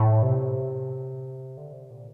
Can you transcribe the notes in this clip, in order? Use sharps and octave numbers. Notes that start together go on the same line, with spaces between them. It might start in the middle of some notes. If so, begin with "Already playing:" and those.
Already playing: A2
C3
D3
C3
A#2